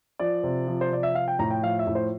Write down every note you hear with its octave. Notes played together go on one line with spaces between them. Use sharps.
F3 D5
C3
F3
C5
C3 D5
E5
F3 F5
G5
A2 A#5
G5
F3 F5
E5
A2
C5